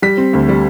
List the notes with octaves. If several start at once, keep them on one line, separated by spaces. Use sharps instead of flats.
G3 B6
C4
D2
G3